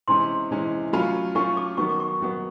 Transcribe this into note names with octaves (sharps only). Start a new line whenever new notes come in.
C3 E3 G#3 C#4 C6
C3 E3 G#3 C#4
F#3 A3 C#4 F4 B5
F#3 A3 C#4 F4 C#6
D6
D#3 F#3 B3 C#6
D6
C#6
D#3 F#3 B3